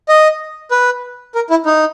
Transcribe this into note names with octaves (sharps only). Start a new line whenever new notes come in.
D#5
B4
A#4
E4
D#4